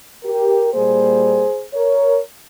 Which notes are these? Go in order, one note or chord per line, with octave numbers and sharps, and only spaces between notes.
G4 A#4
A#2 G3 A#3 G#4 C5
A#4 C#5